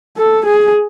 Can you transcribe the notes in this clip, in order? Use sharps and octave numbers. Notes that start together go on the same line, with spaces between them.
A4
G#4